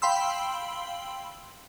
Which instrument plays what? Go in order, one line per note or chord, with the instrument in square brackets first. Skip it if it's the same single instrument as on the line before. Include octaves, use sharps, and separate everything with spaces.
[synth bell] F5 G5 B5 C6 E6